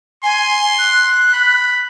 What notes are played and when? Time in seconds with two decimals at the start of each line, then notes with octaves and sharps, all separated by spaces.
0.23 G#5 C6
0.79 F#6
1.33 B5